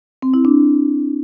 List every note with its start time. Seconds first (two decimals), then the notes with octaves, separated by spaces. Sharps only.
0.22 C4
0.34 E4
0.45 D4